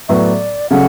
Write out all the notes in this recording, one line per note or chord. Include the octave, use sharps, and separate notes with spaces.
A2 F#3 B3 D5 E5
C#3 F#3 A3 C#4 F#5